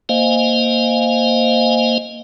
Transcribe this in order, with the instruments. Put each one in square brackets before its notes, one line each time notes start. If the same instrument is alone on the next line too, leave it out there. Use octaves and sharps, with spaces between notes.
[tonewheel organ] A#3 C5 D#5 F5 G#5